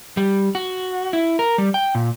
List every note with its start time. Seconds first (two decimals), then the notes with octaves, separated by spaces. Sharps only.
0.17 G3
0.55 F#4
1.13 E4
1.39 A#4
1.58 G3
1.74 G5
1.95 A#2